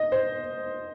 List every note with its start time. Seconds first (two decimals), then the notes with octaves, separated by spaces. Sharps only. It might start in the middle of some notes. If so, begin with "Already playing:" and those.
Already playing: D#5
0.12 C5